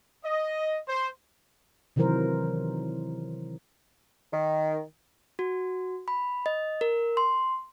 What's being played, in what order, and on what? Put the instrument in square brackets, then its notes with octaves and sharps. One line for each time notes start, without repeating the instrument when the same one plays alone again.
[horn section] D#5
C5
[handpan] C3 D#3 E3 F#3 A#4 C5
[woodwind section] D#3
[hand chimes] F#4
B5
D#5
A#4
C6